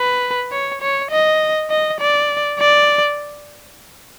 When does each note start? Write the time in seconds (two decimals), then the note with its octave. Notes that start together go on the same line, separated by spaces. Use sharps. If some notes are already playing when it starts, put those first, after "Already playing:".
Already playing: B4
0.51 C#5
0.81 C#5
1.11 D#5
1.70 D#5
2.00 D5
2.59 D5